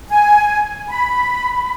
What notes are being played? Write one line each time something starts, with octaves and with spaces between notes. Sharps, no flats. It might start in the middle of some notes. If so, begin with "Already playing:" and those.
G#5
B5